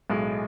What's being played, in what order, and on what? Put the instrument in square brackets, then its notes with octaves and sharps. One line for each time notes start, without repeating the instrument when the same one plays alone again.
[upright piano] B1 A2 G#3